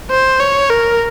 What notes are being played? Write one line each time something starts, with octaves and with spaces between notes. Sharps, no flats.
C5
C#5
A#4